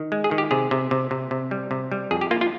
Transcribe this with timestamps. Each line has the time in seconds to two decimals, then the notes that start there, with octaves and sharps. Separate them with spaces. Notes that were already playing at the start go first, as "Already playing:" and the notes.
Already playing: D#3
0.12 G#3
0.24 G#4
0.31 D#3
0.38 G4
0.51 C3 G#4
0.71 C3
0.91 C3
1.11 C3
1.31 C3
1.51 G3
1.71 C3
1.92 G3
2.11 F2 G#4
2.21 G4
2.31 A#3 F4
2.41 F4